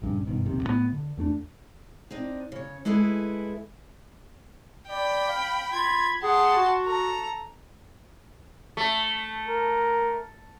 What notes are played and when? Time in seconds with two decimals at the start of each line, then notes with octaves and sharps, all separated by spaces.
0.02 A#1 G2 C#3
0.26 F#1 G2 B2 D#3
0.45 A#1 D#2 C3
0.63 A2 F3 B3
0.93 D3
1.17 E2 A3 C#4 D4
2.11 C4 D4 D#4
2.52 C#3 C#5
2.85 G#3 E4 G#4 A4 B4
4.89 D5 G5 B5
5.28 F5
5.74 F4 B5 G#6
6.23 G#4 F#5 A5 C6
6.56 F#4
6.87 A4 A#5
8.77 A3
9.48 A#4